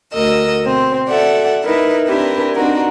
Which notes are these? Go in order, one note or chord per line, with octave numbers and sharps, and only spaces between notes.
D2 F#4 A#4 D#5 E6
B2 C4
F#4 A4 D5 E5 F#5
D#4 E4 A#4 B4 E5
C4 D4 E4 G4 A#4 B4
C4 D4 D#4 F#4 A#4